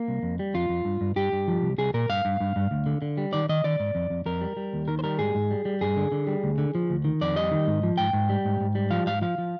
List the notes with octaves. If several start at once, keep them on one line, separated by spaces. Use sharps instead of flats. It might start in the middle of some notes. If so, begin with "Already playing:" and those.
Already playing: A#3
C2
F2
G3
F2 F4
F2
G2
G2
G2 G4
G2
F3
C2
C2 G#4
A#2 A#4
G2 F5
G2
G2
G2
D2
D3
D3
G3
D#3 D5
D#3 D#5
D#3 D5
G#2
F2
F2
F2 A#4
G3
G3
D#2
D#3 A#4
C5
G3 A#4
G#2 G#4
G#2
G3
G3
G2 G#4
D3
D3
G3
D2
D3
F3
D2
D#3
F2 D5
G3 D#5
D#3
G#2
F3
G#2 G5
G#2
G3
G#2
G#2
G3
F3 F5
G#2 F5
F3 F5
F3